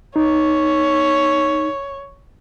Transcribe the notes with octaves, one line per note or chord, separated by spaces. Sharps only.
D#4 C#5